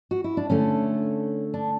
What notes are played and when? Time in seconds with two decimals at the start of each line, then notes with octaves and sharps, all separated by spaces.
0.11 F#4
0.24 E4
0.37 D4
0.50 D3 A3 C#4
1.54 D4